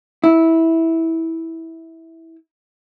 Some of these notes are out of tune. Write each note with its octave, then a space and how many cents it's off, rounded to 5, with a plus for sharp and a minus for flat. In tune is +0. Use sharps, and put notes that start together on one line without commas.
E4 -15